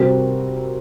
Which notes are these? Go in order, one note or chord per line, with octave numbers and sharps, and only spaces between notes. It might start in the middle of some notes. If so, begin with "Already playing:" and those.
Already playing: C3 G3 C4 F#4 A#4